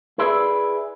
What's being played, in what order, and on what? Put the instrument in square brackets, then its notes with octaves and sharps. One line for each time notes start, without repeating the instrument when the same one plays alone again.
[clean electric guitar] E4 G#4 B4 D5 E5